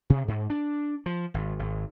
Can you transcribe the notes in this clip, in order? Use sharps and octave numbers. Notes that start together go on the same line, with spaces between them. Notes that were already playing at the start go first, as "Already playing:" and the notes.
C3
G#2
D4
F3
G#1
G#1